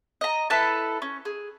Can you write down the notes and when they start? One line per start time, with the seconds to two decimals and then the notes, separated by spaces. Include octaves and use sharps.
0.21 D#5 A#5
0.50 E4 A4 B4 A5
1.02 C#4
1.25 G#4